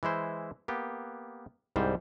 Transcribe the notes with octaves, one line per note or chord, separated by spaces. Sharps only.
E3 G#3 E4 C5
A#3 B3 G4
C2 G#2 G3 C5